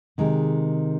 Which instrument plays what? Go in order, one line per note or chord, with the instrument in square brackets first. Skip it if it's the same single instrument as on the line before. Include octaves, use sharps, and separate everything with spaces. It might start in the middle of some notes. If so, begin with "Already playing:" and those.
[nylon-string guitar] C3 D#3 G#3